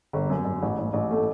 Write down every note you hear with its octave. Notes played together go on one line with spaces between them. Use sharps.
G1
F#2
F#2
A1
A1
A1
A3